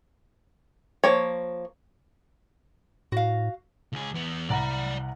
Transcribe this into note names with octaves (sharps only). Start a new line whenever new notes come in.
F3 A#3 C#5
A2 F#4 F5
C#2 G#4
E2 B3
C2 D5 F#5 A#5 B5